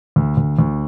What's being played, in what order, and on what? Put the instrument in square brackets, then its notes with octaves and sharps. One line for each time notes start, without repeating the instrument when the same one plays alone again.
[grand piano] D2
D2
D2